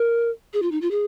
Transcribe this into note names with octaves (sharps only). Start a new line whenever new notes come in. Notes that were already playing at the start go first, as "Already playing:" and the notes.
Already playing: A#4
G#4
F4
D#4
F4
G#4